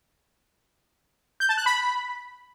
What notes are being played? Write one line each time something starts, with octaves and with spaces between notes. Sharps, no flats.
G6
A5
F#6
B5